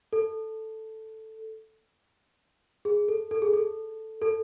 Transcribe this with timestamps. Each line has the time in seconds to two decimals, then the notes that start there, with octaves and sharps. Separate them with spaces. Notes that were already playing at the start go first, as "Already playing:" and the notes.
0.13 A4
2.85 G#4
3.08 A4
3.31 A4
3.42 G#4
3.53 A4
4.22 A4